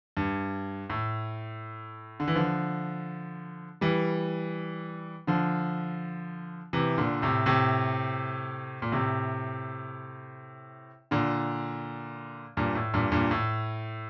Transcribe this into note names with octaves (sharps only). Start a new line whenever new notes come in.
G2
A2
D3
E3
D3 F3
E3 G3
D3 F3
C3 E3
A#2 D3
A2 C3
A2 C3
A#2
A2 C3
A#2 D3
G2 A#2
A2
G2 A#2
G2 A#2
A2